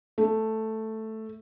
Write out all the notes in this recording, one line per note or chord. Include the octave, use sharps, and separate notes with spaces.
A3